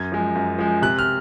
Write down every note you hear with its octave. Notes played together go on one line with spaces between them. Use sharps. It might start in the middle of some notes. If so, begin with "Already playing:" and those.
Already playing: F#2 G#6
F3 G#3
F#2
F3 G#3
C3 F#6
F6